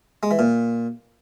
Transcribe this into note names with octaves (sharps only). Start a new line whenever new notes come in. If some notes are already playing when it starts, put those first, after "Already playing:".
G#3
E3
A#2